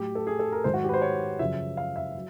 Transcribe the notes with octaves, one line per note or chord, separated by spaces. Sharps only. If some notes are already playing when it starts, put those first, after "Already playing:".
Already playing: A2 F#3 G4
A4
G#4
A4
A#4
G#2 D#3 F#3 C5
F#4
G4
B4
C5
C#5
F#2 C#3 F3 E5
F5
E5
F#3